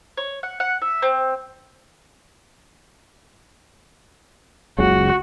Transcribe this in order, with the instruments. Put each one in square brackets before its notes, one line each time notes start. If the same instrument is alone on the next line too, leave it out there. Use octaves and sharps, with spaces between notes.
[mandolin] C#5
F#5
F#5
E5
C4
[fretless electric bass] F#1 C#2 C#3 [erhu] F#4